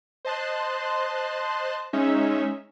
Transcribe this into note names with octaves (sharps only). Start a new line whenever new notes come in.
C5 D#5 A5 C6 F#6
G#3 C#4 D#4 E5